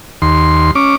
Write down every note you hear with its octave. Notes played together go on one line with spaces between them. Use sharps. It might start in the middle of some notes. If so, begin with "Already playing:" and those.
D#2 C6
C#4 D6